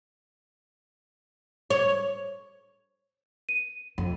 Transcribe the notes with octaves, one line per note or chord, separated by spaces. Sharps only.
C#5
D#7
F2